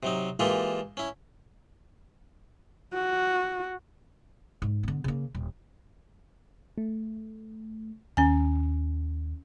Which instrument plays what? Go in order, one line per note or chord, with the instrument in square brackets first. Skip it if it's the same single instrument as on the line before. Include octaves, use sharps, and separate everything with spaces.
[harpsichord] C3 F#3 D#4
E3 G#3 A#3 F4 G4 A4
C#4 E4
[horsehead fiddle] F#4
[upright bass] G#2
D3 B3
C#3 A#3
D#1
[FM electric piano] A3
[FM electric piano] D#2 [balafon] C#4 G#5